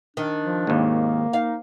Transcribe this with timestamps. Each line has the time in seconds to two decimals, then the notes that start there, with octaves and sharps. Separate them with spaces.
0.17 D#3 D4
0.43 F3
0.67 G#1 D#2 A#3
1.33 D#4 F5